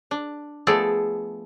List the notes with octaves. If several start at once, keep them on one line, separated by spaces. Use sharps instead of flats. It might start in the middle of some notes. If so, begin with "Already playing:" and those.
D4
F3 A3 B3 G#4 A4 D5